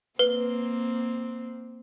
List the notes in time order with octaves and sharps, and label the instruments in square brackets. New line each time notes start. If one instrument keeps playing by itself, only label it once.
[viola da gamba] A#3 C4 [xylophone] B4